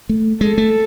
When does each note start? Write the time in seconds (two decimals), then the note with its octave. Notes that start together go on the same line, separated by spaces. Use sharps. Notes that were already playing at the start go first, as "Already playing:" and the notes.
0.09 A3
0.41 G#3 A4
0.58 A3